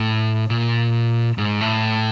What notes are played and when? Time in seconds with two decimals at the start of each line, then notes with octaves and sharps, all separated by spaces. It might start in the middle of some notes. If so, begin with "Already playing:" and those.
Already playing: A2
0.50 A#2
1.38 G#2
1.61 A2